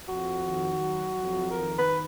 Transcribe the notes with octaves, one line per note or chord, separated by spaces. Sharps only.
F2 F#4
D#3
F#3
F2
D#3 A#4
B4